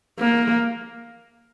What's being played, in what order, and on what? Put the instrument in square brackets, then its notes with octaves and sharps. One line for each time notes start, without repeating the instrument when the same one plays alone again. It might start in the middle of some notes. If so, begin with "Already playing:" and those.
[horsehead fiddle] A#3